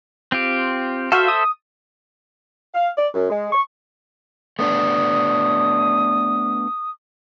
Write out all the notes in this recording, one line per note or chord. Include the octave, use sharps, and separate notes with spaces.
C4 F4 G4
F#4 A4 C5 E5 F5
D#6
F5
D5
F#2
G#3
C#6
A3 B3 D4 D#6